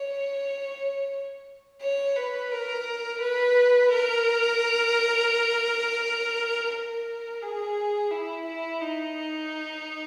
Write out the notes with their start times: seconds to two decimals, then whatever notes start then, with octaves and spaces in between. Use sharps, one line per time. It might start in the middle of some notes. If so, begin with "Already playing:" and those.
Already playing: C#5
1.82 C#5
2.16 B4
2.51 A#4
3.21 B4
3.92 A#4
6.71 A#4
7.42 G#4
8.11 E4
8.46 E4
8.81 D#4